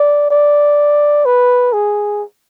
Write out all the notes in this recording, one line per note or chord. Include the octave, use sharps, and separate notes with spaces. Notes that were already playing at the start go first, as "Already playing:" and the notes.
Already playing: D5
D5
B4
G#4